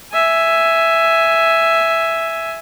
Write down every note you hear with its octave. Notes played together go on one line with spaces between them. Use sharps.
E5 G#5